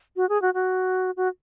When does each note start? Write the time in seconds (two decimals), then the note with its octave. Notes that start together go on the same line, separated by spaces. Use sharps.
0.16 F#4
0.29 G#4
0.42 F#4
0.54 F#4
1.17 F#4